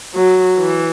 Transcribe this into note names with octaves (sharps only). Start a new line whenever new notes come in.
F#3
E3